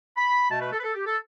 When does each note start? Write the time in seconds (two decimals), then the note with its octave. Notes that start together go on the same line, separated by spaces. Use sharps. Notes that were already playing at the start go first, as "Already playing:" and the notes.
0.17 B5
0.51 B2 A3 A5
0.61 B4
0.73 A4
0.80 B4
0.84 A4
0.95 G4
1.06 A4